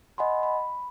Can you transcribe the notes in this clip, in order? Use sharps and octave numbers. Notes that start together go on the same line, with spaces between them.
D#5 F#5 G#5 B5 C6
B5